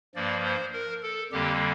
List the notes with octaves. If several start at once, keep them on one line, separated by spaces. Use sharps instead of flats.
G2 F3 A#3 D5
C5
A#4
A4
F2 D3 G3 A#3 G4